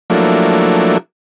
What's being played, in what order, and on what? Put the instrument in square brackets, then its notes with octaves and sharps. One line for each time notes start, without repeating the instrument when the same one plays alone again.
[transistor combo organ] F3 F#3 A3 A#3 D4 E4